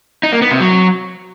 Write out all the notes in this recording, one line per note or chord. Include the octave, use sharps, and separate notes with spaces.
D#4
A#3
B3
C3
F#3